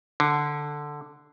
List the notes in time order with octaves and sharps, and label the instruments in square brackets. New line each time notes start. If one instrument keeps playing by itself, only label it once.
[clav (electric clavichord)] D3